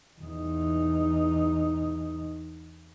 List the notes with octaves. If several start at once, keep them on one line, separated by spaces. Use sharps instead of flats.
E2 D#4